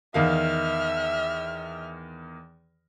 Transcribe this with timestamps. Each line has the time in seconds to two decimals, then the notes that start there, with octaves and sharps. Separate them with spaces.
0.14 E2 D#3 E5 F5 F6